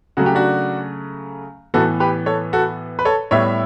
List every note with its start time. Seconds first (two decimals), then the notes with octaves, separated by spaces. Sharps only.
0.17 C#3 F#3 A3 F#4
0.26 G4
0.35 D4 F#4
1.74 A2 E3 B3 F#4 A4
2.00 G4 B4
2.26 A4 C#5
2.53 F#4 A4
2.99 B4
3.05 A4 C#5
3.31 A2 G3 B3 C#5 E5